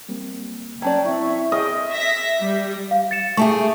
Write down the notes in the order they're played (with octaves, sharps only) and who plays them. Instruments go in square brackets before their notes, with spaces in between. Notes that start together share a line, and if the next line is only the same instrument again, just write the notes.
[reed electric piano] G3 A#3 C4
[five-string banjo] F#3 C#4 D5 [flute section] G5 A5 G#6
[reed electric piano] C4 E4 [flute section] E5 C#6
[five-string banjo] G#4 [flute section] C#5 E5 G5 [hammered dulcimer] D#5 [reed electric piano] F6
[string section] E5 A#6 B6
G3
[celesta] F5
A6 C#7 E7
[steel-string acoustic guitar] A3 G4 G#4 [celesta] E5 A5 C#6